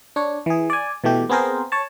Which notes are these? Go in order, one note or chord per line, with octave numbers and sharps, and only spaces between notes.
D4 C#5
E3 G#4
D5 G#5
B2 E3 A3 G4
B3 C4 G#4 A#4 C5
C#5 A5